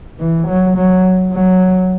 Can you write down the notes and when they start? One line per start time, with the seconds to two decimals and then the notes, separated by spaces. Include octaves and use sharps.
0.20 E3
0.47 F#3
0.76 F#3
1.33 F#3